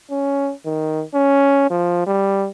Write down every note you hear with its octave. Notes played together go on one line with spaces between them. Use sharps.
C#4
D#3
C#4
F3
G3